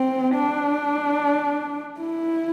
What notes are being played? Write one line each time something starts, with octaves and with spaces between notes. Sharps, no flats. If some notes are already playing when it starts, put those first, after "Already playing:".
Already playing: C4
D4
E4